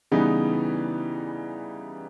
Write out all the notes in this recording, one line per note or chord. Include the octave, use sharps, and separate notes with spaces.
C#3 E3 G3 B3 D#4